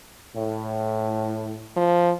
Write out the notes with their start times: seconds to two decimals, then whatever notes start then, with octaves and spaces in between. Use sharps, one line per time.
0.35 A2
1.77 F3